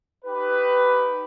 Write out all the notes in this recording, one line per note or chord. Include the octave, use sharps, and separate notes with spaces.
D#4 G4 B4